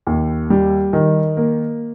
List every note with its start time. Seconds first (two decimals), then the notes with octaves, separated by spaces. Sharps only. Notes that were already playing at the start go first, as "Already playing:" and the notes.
0.07 D#2
0.50 G3
0.93 D#3
1.37 A#3